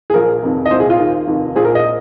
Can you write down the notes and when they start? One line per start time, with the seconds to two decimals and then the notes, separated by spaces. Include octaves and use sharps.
0.10 G#4
0.14 A#1 A#2 F3 A#4
0.43 F1 F2 D#3
0.65 D#5
0.70 C2 A#2 F3 C5
0.80 G#4
0.90 F4
0.99 D#2 D#3
1.27 F1 D#2 D#3
1.55 A#1 A#2 F3 G#4
1.65 A#4
1.75 D#5